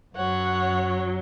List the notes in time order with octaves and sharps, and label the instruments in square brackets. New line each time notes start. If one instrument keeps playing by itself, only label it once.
[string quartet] F#2 F#3 C#5 F#5